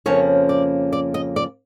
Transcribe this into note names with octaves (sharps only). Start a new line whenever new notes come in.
F2 C#3 F3 A#3 C#4 C#5
D5
D5
D#5
D5